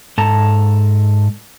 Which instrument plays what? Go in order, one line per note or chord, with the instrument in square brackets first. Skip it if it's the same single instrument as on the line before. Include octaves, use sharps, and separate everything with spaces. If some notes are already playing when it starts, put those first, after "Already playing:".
[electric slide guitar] G#2 A4 A5 A#5